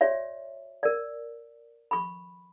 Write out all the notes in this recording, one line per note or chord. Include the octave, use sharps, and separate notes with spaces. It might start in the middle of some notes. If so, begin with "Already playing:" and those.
F#4 C#5 D5 E5
A#4 D5
B5 C#6